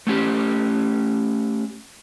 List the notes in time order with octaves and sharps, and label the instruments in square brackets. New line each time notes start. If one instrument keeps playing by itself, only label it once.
[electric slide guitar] A3 C#4 G4